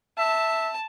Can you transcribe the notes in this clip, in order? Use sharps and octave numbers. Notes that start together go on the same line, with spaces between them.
E5 A5